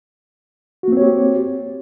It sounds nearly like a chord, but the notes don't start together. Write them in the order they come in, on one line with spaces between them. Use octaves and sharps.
F#4 A#3 C4 C#5 G4